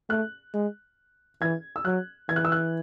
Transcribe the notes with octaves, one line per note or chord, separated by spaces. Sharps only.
A3 F#6
G#3
E3 G#6
E6
F#3 F#6
E3 G#6
F#6
E6
F#6